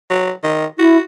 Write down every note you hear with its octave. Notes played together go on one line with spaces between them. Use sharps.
F#3
D#3
E4 F#4